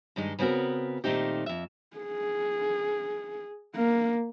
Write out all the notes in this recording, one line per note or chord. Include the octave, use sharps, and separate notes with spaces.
G2 D#3 G#3 D#4
C#3 B3 C4 F#4 A#4
A#2 D#3 A3 C4 D#4 G4
F2 E5
G#4
A#3